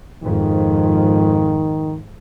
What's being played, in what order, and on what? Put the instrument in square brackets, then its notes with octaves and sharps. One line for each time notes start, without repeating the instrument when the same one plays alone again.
[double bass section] F2 G#2 [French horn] D#3